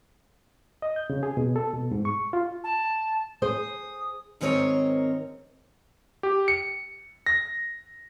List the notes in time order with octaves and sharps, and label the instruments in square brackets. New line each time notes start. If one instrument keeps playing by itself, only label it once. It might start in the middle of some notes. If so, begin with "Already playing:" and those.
[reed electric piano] D#5
G6
C#3
G#4
B2
A4
B2
G#2
C#6
F4
[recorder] A5
[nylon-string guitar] G#4 C5 [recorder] D#6
[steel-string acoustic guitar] G#2 D#3 C4 A#4 C#5 D#5
[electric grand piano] G4
C#7
A#6